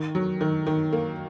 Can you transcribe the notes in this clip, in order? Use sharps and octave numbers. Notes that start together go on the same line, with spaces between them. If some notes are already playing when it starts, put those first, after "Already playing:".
Already playing: D#3
F#3
D#3
D#3
A#3